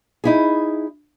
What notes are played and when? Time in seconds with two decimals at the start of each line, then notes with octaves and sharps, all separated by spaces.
0.24 D#4 E4 G#4